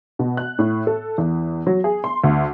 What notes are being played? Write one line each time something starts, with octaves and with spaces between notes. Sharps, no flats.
B2
F#6
A2
A4
E2
F#3
G#4
C6
D2